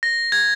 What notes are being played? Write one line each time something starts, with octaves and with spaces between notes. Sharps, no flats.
A#6
G#6